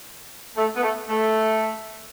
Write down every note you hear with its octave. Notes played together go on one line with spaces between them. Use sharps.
A3
B3
A3
A3